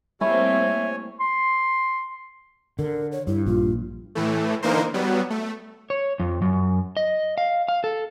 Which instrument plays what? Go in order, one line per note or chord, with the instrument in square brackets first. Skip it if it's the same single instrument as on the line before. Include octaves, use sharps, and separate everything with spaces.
[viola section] G3 A#3 C4 [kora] A3 E4 [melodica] C#5 G#5 [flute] E5
[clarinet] C6
[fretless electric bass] D3 [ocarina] A#4
[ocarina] C#5
[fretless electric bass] G2 [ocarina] E4
[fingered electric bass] A#1 [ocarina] F4
[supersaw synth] A2 E3 A3
D3 E3 A#3 D#4 A#4 C5
F#3 G3 B3
A3
[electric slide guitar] C#5
F2
F#2
D#5
F5
F5
A4